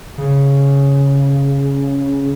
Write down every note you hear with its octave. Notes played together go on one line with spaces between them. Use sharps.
C#3